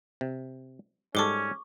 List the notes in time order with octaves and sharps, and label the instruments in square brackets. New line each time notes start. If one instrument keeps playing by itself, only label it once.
[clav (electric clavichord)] C3
[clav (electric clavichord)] G#2 G3 A4 [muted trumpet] C#4 [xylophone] C#6 D6 G7